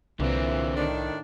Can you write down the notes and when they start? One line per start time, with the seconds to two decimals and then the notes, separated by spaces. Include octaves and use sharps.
0.20 C2 A#2 D3 E3 C4
0.76 A2 D#3 D4